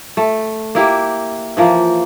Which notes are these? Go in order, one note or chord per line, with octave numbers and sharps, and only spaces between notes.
A3
A#3 E4 G4
E3 F3 A#3